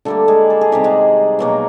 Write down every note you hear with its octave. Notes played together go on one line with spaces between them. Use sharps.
D3 G3 A3 A#3 A4
G#3 G#4
A4
G#4
C3 D#3 G3 G4
G#3 G#4
B2 F#3 A#3